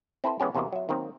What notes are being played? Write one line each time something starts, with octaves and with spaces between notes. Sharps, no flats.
C4 E4 A4 B4 C5
E3 G#3 B3 C#4 G4
E2 C3 E3 A#3 F#4 D#5
F#3 E5
D#3 F#3 A#3 C4